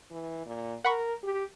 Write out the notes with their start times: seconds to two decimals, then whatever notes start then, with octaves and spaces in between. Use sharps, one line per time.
0.11 E3
0.46 A#2
0.85 A#4 F#5 B5 C#6
1.23 G4